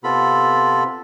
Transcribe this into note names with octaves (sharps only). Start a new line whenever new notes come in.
C3 B3 F4 A4 B5